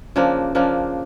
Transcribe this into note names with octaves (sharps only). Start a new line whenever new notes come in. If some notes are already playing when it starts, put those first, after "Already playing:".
C#3 F3 A#3 D4
C#3 F3 A#3 D4